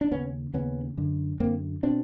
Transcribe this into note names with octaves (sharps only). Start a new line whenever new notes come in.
D4
D#2 C#3 B3 C#4
D#2 C#3 B3 C#4
F#2 D3
F#2 D3 A#3 C4
B2 C4 D4